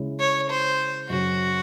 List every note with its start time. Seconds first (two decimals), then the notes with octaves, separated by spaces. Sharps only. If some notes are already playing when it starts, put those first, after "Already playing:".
Already playing: C#3 G#3 C#4 E4
0.20 C#5
0.50 C5
1.10 F#2 C#3 F#3 C#4 F#4